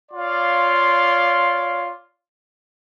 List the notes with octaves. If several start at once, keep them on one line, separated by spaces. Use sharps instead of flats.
F4 C#5 D5 F5 C6